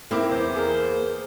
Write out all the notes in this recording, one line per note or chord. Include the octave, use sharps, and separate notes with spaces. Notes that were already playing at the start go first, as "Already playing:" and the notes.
A#3 C4 E4 D6
E2 C5
G#4 A#4